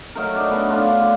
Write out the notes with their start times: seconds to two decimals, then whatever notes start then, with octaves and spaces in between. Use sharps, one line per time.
0.15 F#3 A3 D#4 A#4
0.35 D4 D#4
0.51 A3 B3
0.69 A3 D4 F4
1.00 D3